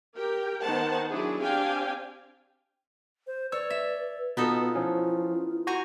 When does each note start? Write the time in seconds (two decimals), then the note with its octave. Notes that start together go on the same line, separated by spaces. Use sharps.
0.17 G4 A#4 G5
0.63 D#3 B3 C5 F#5 A5
1.11 F#3 D4 E4 G#4
1.43 C4 D4 G4 F5 G5 G#5
3.27 C5
3.52 B4 C#5 D5 E6
3.70 E5
4.37 B2 B3 D#4 F4 A4
4.75 F3 C#4 E4
5.67 F#4 C5 G#5 A#5